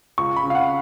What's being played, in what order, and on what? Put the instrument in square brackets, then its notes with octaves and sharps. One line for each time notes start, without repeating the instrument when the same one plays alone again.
[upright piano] C#2 C#6
B5
C#3
F5
F#5